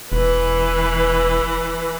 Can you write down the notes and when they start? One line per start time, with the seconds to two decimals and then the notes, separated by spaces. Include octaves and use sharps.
0.12 E1 E3 B4